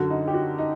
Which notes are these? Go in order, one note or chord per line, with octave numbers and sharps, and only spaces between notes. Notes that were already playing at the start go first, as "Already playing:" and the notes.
Already playing: F#2 D3 F#4
D#4
G4
F#4
D#4